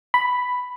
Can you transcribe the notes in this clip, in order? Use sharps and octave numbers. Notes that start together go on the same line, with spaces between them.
B5